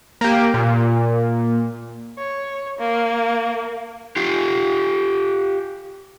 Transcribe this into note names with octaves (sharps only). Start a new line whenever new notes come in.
A#3 G4
A#2
C#5
A#3
F4 G4